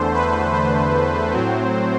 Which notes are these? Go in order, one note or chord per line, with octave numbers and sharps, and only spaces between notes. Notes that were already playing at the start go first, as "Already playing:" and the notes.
Already playing: E2 D3 A3 C5
B4
C5
A2 F#3 C4